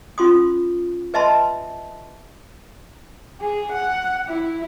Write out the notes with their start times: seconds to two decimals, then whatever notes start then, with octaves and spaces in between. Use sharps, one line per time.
0.18 C#4 F4 C6 D#6
1.14 B4 D#5 E5 A5 B5 C6
3.40 G#4
3.72 F#5
4.29 E4